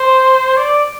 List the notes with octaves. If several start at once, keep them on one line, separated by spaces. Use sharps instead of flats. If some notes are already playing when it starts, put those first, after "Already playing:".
Already playing: C5
D5